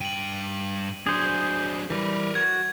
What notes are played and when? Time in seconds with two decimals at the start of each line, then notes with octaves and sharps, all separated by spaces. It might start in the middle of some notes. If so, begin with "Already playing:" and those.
0.01 G2 G5 D#7 F#7
1.07 F#3 D4 G#4 C5
1.90 E3 G3 A#4 B4
2.35 F#4 G#6